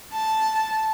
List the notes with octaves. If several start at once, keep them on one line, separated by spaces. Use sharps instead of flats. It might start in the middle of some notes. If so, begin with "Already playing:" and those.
A5